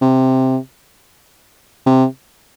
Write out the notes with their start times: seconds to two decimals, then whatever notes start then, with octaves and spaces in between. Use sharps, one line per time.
0.02 C3
1.86 C3